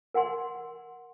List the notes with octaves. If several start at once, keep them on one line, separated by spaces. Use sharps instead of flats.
A#4 F#5 G#5 C6